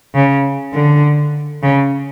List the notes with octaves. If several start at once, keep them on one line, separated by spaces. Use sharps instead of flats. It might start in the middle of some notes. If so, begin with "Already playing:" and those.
C#3
D3
C#3